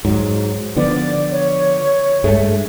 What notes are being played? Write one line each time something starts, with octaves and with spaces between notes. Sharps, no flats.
G#2 F#3
D3 F3 B3 D5
C#5
G2 G#3 A3